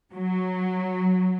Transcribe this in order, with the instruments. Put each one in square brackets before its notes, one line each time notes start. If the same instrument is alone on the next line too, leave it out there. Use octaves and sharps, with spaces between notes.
[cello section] F#3